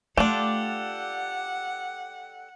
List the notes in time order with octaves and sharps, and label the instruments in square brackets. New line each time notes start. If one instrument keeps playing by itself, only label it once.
[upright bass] A3 [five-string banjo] D4 F4 [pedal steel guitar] G4 A4 D5 [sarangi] F#5